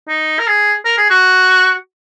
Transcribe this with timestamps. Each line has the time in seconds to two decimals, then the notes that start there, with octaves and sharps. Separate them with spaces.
0.08 D#4
0.39 A#4
0.47 G#4
0.85 A#4
0.97 G#4
1.10 F#4